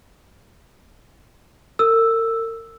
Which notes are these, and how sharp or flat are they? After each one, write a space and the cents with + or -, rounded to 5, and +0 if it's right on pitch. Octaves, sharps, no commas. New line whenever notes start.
A#4 -40 E6 +0